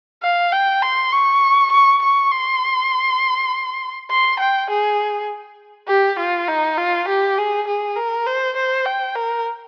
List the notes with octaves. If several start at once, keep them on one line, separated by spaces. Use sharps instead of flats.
F5
G5
C6
C#6
C#6
C#6
C6
C6
G5
G#4
G4
F4
D#4
F4
G4
G#4
G#4
A#4
C5
C5
G5
A#4